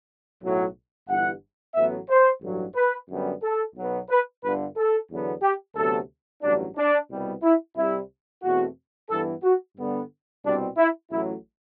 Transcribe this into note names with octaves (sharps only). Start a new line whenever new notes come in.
B1 A2 F#3
G1 G2 E3 F#5
A1 A2 F#3 B3 E5
C5
A1 G2 F#3
B4
F#2 D3 G3 B3
A4
B1 B2 F#3 B3
B4
G1 G2 D3 B4
A4
E2 D3 F#3 B3
G4
D2 C3 F#3 B3 A4
A1 G2 F#3 D4
D4
C2 B2 G3 B3
E4
C2 C3 G3 E4
E2 B2 A3 C4 F#4
G2 E3 B3 A4
F#4
G2 D3 G3 B3
C2 B2 G3 C4 D4
E4
A1 A2 F#3 E4